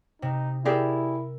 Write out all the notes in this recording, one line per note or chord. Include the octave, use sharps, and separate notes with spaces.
C3 D#4
E4 G4 G#4 A#4 D5 E6